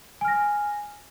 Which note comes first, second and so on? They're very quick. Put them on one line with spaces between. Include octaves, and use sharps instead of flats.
G#5 F6 A#6